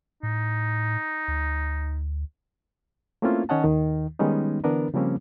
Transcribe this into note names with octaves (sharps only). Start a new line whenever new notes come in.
A2 D#4
D2
A3 A#3 C4 C#4 E4 F4
D#3 C#4 C#5 D#5 F#5 A5
D#2 D#3
D#3 G3 G#3 B3 C#4 D#4
D3 E3 B3 D4 A#4 B4
C#3 F3 G3 A#3 C4 C#4